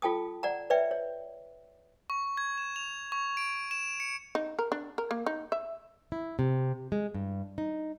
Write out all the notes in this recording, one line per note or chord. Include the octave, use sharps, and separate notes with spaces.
F4 A4 G5 A5 D#6
D5 F#5 A#5
B4 C#5 D5 E5 G5
C#5
C#6
G#6
E7
F7
C#6
D7
E7
C#7
D#4
A#4
D4
A#4
A#3
D#4
E5
E4
C3
G#3
G2
D#4